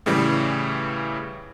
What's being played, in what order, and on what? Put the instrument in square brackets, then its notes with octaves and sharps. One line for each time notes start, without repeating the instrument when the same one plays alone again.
[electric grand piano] A2 C#3 E3 G3